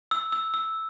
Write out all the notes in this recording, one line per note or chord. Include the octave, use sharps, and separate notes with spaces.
E6
E6
E6